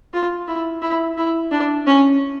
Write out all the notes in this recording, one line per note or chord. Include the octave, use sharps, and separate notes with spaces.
F4
E4
E4
E4
D4
C#4